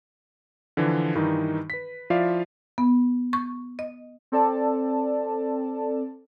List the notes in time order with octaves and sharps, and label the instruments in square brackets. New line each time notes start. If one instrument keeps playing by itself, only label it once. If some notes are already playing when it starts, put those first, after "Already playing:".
[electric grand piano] D3 E3 F3
G2 D#3 E3 D#4
B4 B6
F3 E4 F4 D5 E5 F5
[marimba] B3
C#6
D#5
[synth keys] C4 A4 D5 A5